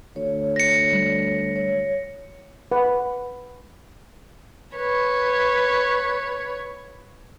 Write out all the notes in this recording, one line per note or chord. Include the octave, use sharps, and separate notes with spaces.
D2 C#5
A#6 C#7
G3
C#5
B4 F#5
B4 C#5